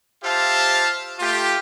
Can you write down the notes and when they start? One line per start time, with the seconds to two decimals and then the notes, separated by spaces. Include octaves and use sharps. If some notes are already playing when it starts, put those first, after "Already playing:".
0.23 F4 G4 C5 E5 F5 A5
1.20 A3 F4 G4